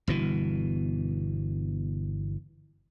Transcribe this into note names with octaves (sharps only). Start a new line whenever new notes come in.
G1 B2 E3